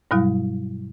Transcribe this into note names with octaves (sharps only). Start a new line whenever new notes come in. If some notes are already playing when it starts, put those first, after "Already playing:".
G2 B2 F#3 G3 E4